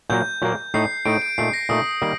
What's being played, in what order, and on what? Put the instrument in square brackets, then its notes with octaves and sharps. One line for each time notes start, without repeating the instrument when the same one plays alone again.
[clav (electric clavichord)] A#2 F#3 A#3 [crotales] G6
[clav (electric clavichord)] A#2 F#3 A#3
[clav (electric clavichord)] A2 A3 D#4 [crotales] C7
[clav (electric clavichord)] A2 A3 D#4 [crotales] D7
[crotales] D7
[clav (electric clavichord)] A#2 A3 D#4 [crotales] C7
[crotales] A#6
[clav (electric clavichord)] A#2 A3 D#4 [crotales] D#6
[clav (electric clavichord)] D#3 G3 A#3